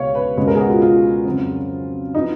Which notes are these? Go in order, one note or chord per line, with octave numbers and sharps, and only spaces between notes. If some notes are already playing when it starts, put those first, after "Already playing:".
Already playing: C#2 B2 G#3 B3 C#5 F5
B4
C#2 B2 G#3 C#4 B4
A#4
G#4
F#4
F4
F4
F2 C#3 F#3
F3 B3 D#4